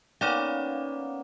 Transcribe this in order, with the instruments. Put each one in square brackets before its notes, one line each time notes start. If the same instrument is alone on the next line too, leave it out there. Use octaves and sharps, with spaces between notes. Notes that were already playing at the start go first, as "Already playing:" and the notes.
[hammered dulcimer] A#3 B3 B4 [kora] C#4 [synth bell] D#4 D5 F5